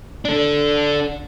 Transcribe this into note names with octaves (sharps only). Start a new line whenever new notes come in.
D4 A4